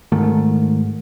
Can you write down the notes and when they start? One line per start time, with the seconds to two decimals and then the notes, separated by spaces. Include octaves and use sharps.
0.12 G#1 G#2 D#3 A3